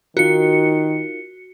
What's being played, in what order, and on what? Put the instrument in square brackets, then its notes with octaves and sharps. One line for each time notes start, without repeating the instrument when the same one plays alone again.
[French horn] D#3 [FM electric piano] D#4 F4 A#4 [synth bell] F#4 C#7